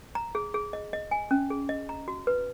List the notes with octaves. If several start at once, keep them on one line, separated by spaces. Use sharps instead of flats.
A#5
G#4
G#4
D#5
D#5
G#5
C#4
G#4
D#5
A#5
F#4
B4